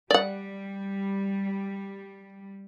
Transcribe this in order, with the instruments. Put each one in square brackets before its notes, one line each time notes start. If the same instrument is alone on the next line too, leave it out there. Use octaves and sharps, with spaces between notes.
[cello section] G3 [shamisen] D5 F#5